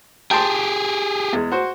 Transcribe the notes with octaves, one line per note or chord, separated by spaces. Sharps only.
G4 G#4 G5 A5 C6
E2 G#3
F#4 C5